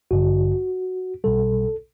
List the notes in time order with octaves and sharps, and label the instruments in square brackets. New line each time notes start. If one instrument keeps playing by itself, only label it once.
[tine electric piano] A1 G2 D3 F#4
B1 B2 G3 A4